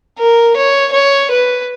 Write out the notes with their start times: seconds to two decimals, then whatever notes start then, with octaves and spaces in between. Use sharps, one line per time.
0.18 A#4
0.56 C#5
0.92 C#5
1.31 B4